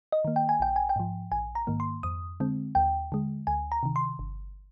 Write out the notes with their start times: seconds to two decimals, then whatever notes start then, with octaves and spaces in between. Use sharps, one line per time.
0.12 D#5
0.25 D#3 A#3
0.36 G5
0.49 G#5
0.60 A#1 G5
0.76 G#5
0.89 G5
0.96 G#2 F3
1.32 A#1 G#5
1.55 A#5
1.67 G#2 D#3 A#3
1.80 C6
2.03 F2 D#6
2.40 D3 G#3 C4
2.75 D#2 G5
3.12 D3 G#3
3.47 D2 G#5
3.72 A#5
3.83 C3 D#3
3.96 C6
4.19 G1